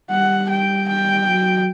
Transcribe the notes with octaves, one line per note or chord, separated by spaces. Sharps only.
G3 F#5
G5
G5
F#3